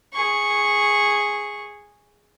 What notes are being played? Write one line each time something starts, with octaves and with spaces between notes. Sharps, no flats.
G#4 C#6